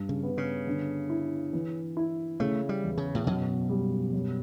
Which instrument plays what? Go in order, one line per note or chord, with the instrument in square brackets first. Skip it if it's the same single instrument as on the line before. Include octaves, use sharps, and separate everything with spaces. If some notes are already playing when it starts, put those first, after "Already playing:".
Already playing: [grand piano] G2
[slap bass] C#3
[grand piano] B3
[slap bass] C#3
[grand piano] D3
E4
E3
E4
[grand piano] C#3 [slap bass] A3
[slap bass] G3
[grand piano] E2
[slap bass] C#3
A2
[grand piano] F#2 [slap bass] B2
[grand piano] G3
F#2